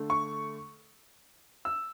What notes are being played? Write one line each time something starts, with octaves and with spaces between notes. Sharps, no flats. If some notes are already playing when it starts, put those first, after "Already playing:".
Already playing: D3 A3
C#6
E6